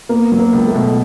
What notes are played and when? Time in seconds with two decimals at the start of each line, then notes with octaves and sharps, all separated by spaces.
0.09 A#3 B3
0.32 F#3
0.39 A#3
0.53 C#2
0.68 A3
0.74 B2